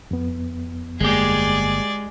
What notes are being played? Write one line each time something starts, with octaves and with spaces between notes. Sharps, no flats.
F2 B3
G1 G#3 A#3 G4 G#4 D5